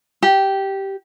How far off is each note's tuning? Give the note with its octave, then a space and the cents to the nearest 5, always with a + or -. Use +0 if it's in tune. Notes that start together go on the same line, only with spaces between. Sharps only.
G4 -10